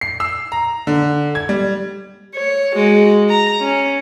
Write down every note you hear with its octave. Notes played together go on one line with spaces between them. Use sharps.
C7
E6
A#5
D3
G#6
G3
C#5
G#3 F#4
A#5
C#4